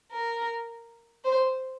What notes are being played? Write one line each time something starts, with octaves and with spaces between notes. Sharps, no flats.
A#4
C5